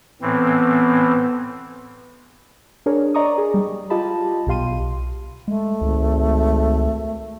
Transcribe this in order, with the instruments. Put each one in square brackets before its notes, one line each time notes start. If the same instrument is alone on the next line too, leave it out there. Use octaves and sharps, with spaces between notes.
[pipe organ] A2 E3 C4 [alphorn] B3
[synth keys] D4 G#4 A#4 C#5
D5 D#5 A#5 C#6 D#6
G#4
G3
F4 G4 D#5 A5 B5
B1 B2 G4 F5 C6 D#7
[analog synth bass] G#3 [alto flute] A3
[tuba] G#1 [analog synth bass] C#2